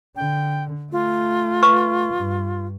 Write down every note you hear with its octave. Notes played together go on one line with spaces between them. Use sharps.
D3 G5
A3 F4
B4 C#6
G2